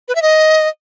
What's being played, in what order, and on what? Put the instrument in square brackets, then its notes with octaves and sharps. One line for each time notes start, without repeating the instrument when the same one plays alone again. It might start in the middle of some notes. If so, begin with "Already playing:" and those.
[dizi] B4
E5
D#5